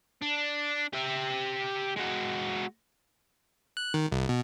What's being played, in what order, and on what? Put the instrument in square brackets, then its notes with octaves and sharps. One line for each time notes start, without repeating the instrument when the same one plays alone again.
[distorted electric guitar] D4
G4 E5
G#3 F#4
[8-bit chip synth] F#6
D#3
C2
B2